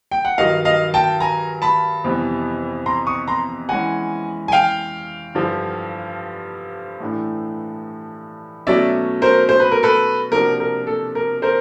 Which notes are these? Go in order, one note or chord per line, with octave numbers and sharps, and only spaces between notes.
G5
F#5
G2 D#3 F#3 D#5 F5
D#5 F5
G5 A5
G#5 A#5
A5 B5
F2 C3 E3 G3 B3
A#5 C6
C#6 D#6
A#5 C6
E3 G#3 C#4 F#5 G#5
G#5
F5 G5
G2 D3 F3
A2 E3 A3 D4
B2 F#3 A3 C#4 D5 E5
A#4 C5
C5
B4
A#4
A4 B4
C3 F3 A#3 D4 F#4 A#4
A#4
A4
A#4
A#4 C5